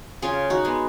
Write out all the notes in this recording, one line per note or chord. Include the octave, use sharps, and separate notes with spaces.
C#3 F4 G#4
D#4 F#4
G#3 B3